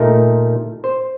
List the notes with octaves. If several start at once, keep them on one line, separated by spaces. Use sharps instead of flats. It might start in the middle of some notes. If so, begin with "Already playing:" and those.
Already playing: A#2 A3 D#4 A#4
C5